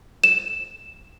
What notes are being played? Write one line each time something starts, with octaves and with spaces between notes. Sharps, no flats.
E7